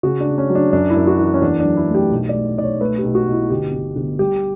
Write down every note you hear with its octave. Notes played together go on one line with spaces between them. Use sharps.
C#3 F#4
D4
C#3
C#4
F#3
D4
F#2 D4
E4
F#2
F#4
E3
E4
C#4
E2 D4
D4
F#3
E4
A3
G4
B1
D5
A3
B1 D5
C#5
A3 B4
G4
B1
F#4
B2
E4
G1 G4
G1
G1
G3 G4